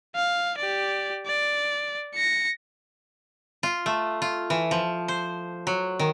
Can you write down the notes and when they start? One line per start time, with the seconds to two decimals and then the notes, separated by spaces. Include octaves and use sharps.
0.16 F5
0.58 G4 D5
1.27 D5
2.15 A#6 C#7
3.63 F4
3.86 A3
4.22 F4
4.50 E3
4.71 F3
5.08 C5
5.67 F#3
5.99 D#3